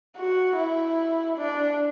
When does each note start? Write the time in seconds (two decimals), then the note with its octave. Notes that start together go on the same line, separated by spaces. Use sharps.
0.16 F#4
0.56 E4
1.37 D4